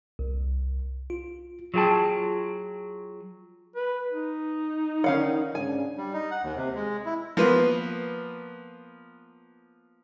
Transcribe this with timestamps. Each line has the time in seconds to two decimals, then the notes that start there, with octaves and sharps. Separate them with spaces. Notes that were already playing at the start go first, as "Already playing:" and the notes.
0.19 C2
1.10 F4
1.74 F#3 F4 G#4 G5 A5
3.76 B4
4.12 D#4
5.04 D3 D#3 C#4 F5 F#5
5.55 G#2 C#3 D4 G#5
5.98 G3
6.13 D#4
6.31 F#5
6.43 D#2
6.56 C3
6.75 G#3
7.06 E4
7.37 F3 A#3 B3 B4